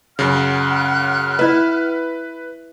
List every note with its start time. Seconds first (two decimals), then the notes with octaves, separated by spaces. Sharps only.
0.19 F#2 C#3 F#5 F6 F#6
1.39 E4 B4 E5